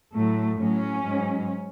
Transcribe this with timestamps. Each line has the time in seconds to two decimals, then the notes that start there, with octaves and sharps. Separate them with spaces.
0.14 A2 F#3 A3
0.58 A2 F#3 C#4
1.03 G#2 F#3